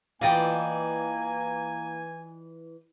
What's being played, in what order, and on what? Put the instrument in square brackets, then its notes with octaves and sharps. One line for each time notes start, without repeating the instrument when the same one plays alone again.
[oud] E3 F4 [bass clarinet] A#3 [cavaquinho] D5 D#5 G5 [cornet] G#5